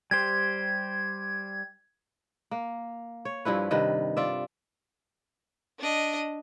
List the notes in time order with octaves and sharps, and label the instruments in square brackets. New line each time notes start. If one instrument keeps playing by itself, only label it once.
[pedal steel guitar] G3 G4 C5 [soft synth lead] G#6
[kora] A#3
C#5
G2 F3 E4 B4
G2 C3 D#3 B4
F4 D5 E5
[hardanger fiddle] D4 D#5